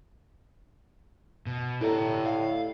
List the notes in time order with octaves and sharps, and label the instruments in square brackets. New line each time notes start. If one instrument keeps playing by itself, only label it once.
[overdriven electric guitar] B2
[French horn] A2 [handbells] E4 A4 D5 [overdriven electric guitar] G4 A#5
[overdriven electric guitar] F5